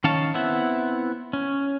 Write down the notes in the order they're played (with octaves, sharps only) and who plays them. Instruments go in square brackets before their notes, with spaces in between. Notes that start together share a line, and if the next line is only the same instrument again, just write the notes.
[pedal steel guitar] D#3 C#4 C#5 F5 A5
B3 C4 E4 E5 F#5
C#4